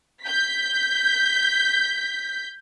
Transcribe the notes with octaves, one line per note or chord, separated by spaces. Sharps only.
G6 B6